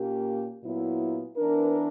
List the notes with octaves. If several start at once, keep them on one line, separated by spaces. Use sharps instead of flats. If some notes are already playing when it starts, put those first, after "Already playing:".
Already playing: A#2 A#3 C#4 G4
A#2 F#3 B3 E4
E3 B3 D4 A#4